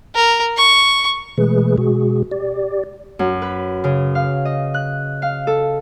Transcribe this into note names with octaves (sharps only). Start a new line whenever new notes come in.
A#4
C#6
B2 E3 G#3 A3 G#4 B4
B2 G#3 F#4 G#4
G4 D5
F#2
B4
C#3
F5
D#5
F#6
F5
A4